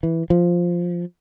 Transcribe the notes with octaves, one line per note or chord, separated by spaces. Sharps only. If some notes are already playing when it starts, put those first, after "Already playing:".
E3
F3